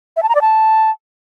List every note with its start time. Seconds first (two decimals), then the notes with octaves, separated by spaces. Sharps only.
0.17 E5
0.23 A5
0.29 A#5
0.35 D5
0.41 A5